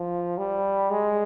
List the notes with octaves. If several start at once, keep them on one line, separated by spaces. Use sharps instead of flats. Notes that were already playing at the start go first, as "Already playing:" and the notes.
Already playing: F3
G3
G#3